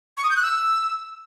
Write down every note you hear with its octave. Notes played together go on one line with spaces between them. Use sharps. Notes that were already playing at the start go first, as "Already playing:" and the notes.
C#6
D#6
G6
F#6
E6